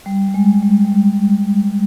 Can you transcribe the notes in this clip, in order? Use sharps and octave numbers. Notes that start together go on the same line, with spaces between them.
G3
G3
G#3
G#3
G3
G#3